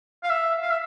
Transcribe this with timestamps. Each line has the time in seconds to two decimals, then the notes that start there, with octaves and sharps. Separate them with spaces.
0.24 F5
0.30 E5
0.62 F5
0.70 E5